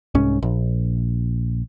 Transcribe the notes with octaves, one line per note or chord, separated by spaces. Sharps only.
C2 G#2 C#4
A#1